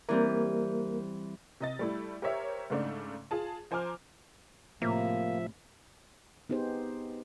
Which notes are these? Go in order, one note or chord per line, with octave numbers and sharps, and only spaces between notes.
E3 G3 A#3 C4 A#4
C3 D#5 A6
G3 A3 E4
G4 A#4 C5 C#5 E5
G#2 C#3 A3 D4
F4 G#4 A5
F3 C5 G#5 A#5 D6 F6
A2 C3 F3 A#3 E5
B3 D#4 G4 G#4 C5